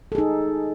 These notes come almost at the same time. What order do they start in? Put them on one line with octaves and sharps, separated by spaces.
A4 G#4 D#4